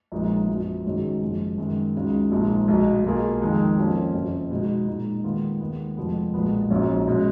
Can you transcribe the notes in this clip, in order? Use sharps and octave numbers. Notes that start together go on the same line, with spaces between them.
A#1 A#2 G#3 B3 D#4
F#2 F3 B3 F#4
G#2 D#3 F#3 C#4 G#4
F#1 F#2 F3 G#3
F#2 D#3 G#3 B3
C#2 C#3 G#3 D#4 F#4
A#1 A#2 F3 G#3 D#4
B1 B2 G#3
B1 B2 A#3 F4 G#4
F2 D#3 G#3 D#4
F2 F3 A#3 C#4
F#1 F2 C#3 F3
B2 G#3 D#4 F#4
A#2 G#3 D#4
D#2 D#3 G#3 B3 F4
D#2 D#3 G#3 B3
F1 F2 F3 G#3 B3
B1 A#2 G#3 B3
A#1 G#2 F#3 C#4 F4
B2 G#3 C#4